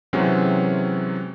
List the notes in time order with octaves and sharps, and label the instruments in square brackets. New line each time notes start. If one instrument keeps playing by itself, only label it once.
[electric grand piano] C3 E3 F#3 G#3 C4 C#4